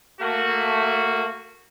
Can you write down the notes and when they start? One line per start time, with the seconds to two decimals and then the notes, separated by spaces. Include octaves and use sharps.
0.21 A3 A#3 F#4